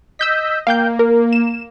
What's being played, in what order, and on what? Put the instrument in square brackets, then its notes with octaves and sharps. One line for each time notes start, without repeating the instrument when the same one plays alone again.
[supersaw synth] D#5 [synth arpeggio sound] E6 G6 B6
[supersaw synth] A#3 [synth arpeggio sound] F5 G5 G6
[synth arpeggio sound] A#4
E7